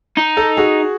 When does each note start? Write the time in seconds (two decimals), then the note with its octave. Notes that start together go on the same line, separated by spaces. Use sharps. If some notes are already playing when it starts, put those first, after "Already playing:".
0.17 D#4
0.37 A4
0.57 F#4 G#4